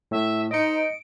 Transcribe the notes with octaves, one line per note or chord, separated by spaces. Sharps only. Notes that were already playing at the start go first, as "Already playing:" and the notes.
A2 E5
D#4 C5 D#5 C#7 D7